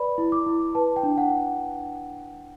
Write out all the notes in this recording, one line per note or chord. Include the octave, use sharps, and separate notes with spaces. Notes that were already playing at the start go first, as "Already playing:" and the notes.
Already playing: B4 D5 B5
E4
D6
E4
B4 A5
G5
D4
F#5